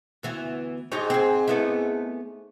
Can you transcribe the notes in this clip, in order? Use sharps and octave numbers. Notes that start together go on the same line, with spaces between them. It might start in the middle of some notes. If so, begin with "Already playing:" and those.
D2 E3 B3
G#2 D#4 G4 C#5
C4 G#4
A3 B3 E4